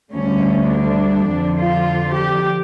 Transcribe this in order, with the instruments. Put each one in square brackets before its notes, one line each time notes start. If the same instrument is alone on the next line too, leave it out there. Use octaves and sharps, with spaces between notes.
[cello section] D2 D3 G3 C#4
D4
F2 D3 F3
F4
G4